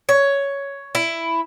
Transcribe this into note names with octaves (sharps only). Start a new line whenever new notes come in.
C#5
E4